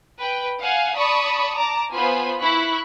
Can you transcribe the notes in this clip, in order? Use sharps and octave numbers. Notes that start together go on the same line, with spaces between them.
B4 G5
F5 F#5 G#5
D5 A5 B5 C#6 D#6
A5 A#5 D6
B3 F4 C5 G#5 B5
E4 B5 C#6 F#6